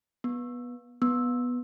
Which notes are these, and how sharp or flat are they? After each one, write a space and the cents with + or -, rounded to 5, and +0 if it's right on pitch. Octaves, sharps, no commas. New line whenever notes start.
B3 -15
B3 -5